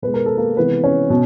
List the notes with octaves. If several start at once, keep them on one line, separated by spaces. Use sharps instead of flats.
B2 G#3 B4
A#4
A4
A#3 A#4
C3 E3 G#3 B3 B4
C#4 C#5
B2